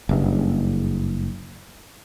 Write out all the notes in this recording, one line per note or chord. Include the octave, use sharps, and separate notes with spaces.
F#1 G2